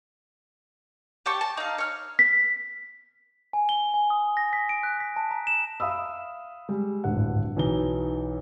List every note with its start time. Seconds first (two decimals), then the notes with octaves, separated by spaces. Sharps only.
1.26 G4 G5 A5 C#6
1.41 A5
1.57 D#4 F5
1.78 C#5 F6
2.19 B6
3.53 G#5
3.69 G7
3.94 G#5
4.10 D#6
4.37 A#6
4.53 B6
4.69 D7
4.83 F#6
5.00 B6
5.16 A5
5.31 A#5
5.47 E7
5.80 E5 F5 B5 D#6 E6
6.69 G3 G#3
7.04 D1 G#1 G2 F#5
7.56 B1 E3 D#4 G7